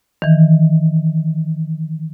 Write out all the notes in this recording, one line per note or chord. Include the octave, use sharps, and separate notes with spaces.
D#3 E3